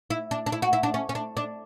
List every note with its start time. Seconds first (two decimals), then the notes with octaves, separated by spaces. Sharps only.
0.10 E4
0.31 D4
0.46 D4
0.52 E4
0.62 F#4
0.73 E4
0.83 D4
0.94 C#4
1.09 C#4
1.15 D4
1.37 D4